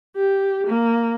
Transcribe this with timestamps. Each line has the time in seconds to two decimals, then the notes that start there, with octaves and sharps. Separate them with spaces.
0.16 G4
0.67 A#3